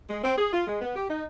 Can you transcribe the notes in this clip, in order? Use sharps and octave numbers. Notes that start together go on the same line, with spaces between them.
G#3
C4
G#4
F4
G#3
B3
G4
D#4